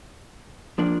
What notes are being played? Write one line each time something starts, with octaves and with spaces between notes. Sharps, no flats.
F3 A#3 D4